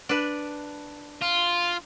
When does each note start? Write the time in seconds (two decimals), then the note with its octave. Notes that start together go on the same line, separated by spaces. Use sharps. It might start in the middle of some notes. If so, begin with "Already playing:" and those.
0.09 D4 B4
1.22 F4